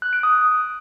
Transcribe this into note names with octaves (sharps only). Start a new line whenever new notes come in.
F#6
D7
D#6